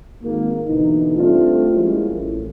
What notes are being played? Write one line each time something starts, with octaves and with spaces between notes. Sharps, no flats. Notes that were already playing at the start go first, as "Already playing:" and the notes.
G#1 A#3
B2 D3 E3 D#4
G3 A3 C4 D4 F4
F3 G3 G#3 A#3 C#4 E4
A1